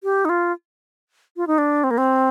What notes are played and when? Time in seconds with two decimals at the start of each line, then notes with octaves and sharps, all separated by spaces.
0.04 G4
0.25 D#4
0.29 F4
1.37 F4
1.47 D#4
1.58 D4
1.84 C4
1.91 A#3
1.98 C4